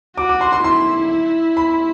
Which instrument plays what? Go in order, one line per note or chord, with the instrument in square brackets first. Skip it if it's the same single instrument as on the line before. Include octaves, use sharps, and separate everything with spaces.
[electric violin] F#4 [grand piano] D6
[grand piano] D6
C6
C6
[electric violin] E4 [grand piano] C6
[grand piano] B5